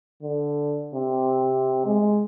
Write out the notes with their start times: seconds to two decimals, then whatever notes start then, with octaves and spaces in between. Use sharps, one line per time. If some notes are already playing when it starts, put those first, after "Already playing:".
0.22 D3
0.95 C3
1.86 G#3